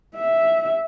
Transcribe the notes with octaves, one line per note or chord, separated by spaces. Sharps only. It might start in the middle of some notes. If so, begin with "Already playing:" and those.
E5